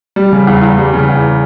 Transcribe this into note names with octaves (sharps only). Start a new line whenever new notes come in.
G3
C#3
E2
E2
G3
C#3
E2